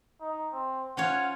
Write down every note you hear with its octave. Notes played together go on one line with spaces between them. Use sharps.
D#4
C4
C#4 F4 C#5 F#5